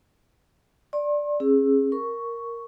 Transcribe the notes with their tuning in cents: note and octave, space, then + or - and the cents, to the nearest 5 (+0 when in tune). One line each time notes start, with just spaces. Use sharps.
D5 +0 C6 +45
C#4 -35 G#4 +0 E6 +0
A#4 +0 C#6 +5